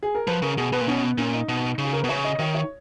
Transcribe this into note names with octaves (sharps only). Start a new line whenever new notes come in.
G#4
A#4
F3 B4
C#3 A#4
B2 G#4
B2 B4
A#2
B2 C#4
B3
A#2 C#4
D#4
B2
C#3
G#4
A#4
B2 B4
C#3 C#5
D#5
D#3 C#5
C#5